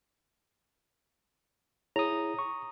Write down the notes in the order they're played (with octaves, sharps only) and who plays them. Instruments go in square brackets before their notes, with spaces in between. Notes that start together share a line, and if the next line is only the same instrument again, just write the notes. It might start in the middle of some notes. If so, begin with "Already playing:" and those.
[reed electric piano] E4 G#4 C#5 [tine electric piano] A#5 D#6
[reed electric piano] C#6